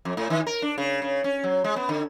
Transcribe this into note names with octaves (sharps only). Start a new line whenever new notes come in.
F2
A2
D#3
A#4
D4
C#3
C#3
C#4
F#3
G#3
B3
D3